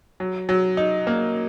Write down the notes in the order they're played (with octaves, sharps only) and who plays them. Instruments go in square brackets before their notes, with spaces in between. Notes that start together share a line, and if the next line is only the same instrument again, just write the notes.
[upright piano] F#3
F#3
D#4
A#3